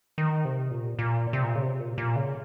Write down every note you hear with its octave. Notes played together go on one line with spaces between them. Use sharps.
D#3
C3
A#2
A#2
C3
A#2
C#3
C3
A#2
A#2
C#3